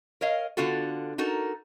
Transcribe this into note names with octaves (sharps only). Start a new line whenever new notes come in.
A#4 C#5 D#5 F5
D3 B3 F4 F#4 A4
D#4 F#4 A4 A#4